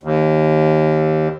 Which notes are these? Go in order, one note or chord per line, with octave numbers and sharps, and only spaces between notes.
D#2